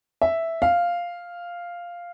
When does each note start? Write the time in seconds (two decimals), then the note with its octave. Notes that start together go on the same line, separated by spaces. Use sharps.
0.22 E5
0.62 F5